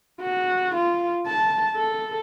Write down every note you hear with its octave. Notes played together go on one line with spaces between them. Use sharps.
F#4
F4
A5
A4